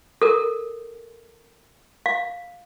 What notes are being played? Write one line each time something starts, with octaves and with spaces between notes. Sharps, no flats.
A4 A#4
F5